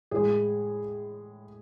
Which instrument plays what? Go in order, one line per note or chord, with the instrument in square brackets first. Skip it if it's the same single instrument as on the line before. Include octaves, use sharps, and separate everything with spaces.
[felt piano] A2 G#3 G#4